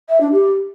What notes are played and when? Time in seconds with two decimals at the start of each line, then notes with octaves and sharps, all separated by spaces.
0.09 E5
0.21 D4
0.32 G4